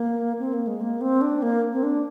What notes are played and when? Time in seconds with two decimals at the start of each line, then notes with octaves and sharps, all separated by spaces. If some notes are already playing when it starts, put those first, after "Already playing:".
Already playing: A#3
0.39 C4
0.53 A#3
0.67 G#3
0.81 A#3
1.01 C4
1.21 D4
1.42 A#3
1.73 C4
1.83 D4